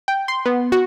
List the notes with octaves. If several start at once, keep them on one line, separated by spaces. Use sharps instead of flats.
G5
C6
B3
F#4